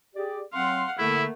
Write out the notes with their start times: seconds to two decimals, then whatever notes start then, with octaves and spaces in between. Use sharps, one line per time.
0.16 G4 G#4 D5
0.53 F#3 C4 F5 F#5 C6
0.99 D3 A3 A#3 E4